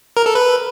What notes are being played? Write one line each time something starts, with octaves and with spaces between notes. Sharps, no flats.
A#4
A4
B4